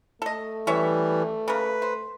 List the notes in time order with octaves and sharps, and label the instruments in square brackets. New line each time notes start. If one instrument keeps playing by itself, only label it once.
[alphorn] A3 [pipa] A4 D#5
[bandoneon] E3 G3 [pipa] C#4 C#5 E5
[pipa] C#3 A#3 [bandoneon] B4
[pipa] C5